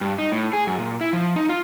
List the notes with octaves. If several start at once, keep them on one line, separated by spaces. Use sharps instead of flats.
G2
D#4
A2
G#4
F#2
A#2
E4
F3
D#4
F4